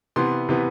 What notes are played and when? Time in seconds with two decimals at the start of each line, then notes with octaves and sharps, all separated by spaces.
0.16 C3 E3 B3 C6
0.49 C3 E3 B3